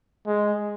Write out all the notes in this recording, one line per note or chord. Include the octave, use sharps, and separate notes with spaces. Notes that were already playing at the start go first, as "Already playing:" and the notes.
G#3